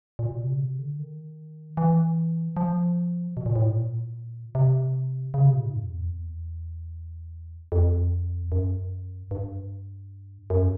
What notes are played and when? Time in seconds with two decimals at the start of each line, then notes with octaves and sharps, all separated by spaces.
0.19 A#2
0.29 B2
0.39 C3
0.49 C#3
0.59 C3
0.79 D3
0.99 D#3
1.77 E3
2.57 F3
3.37 B2
3.46 A#2
3.56 A2
3.65 A#2
4.55 C3
5.34 C#3
5.45 C3
5.54 A#2
5.64 G#2
5.74 F#2
5.84 F2
5.94 E2
6.04 F2
6.14 E2
7.72 F2
8.52 F#2
9.31 G2
10.50 F#2